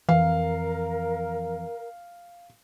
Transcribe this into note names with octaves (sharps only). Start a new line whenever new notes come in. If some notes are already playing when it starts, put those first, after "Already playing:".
F2 E3 A#4 F5